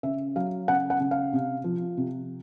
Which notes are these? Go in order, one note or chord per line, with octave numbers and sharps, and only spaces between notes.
C#3 E5
F#3 F5
C#3 F#5
F#5
C#3
F5
C3
F3
C3